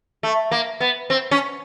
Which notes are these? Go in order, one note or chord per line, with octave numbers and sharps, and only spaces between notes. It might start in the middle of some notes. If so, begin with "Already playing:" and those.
A3
A#3
B3
C4
C#4